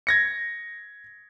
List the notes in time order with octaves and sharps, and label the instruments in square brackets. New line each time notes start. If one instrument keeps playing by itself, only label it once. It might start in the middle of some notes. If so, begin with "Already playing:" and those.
[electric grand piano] G#6 A#6 C#7